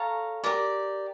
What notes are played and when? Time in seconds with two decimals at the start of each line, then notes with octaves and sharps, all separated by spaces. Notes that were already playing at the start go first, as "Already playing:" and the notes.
Already playing: A4 C#5 F5 A#5
0.44 G4 A#4 D5